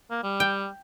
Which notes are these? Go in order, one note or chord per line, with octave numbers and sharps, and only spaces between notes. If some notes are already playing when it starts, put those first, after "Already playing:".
A#3
G3
G5